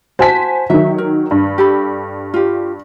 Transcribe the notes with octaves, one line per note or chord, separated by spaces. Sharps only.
F#4 C5 G#5 A5 B6
D#3 F#3 E5
A#4
G2
G4 A4 B5
F4 G4